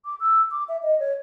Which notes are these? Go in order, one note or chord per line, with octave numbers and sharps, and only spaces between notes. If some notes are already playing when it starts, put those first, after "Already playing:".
D6
E6
D6
E5
D#5
C#5